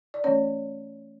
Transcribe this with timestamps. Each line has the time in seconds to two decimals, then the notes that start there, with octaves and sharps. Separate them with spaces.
0.14 D5
0.24 E3 A3 C#4 C#5